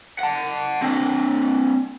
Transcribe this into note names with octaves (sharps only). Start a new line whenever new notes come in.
F#5 A5
C4 D4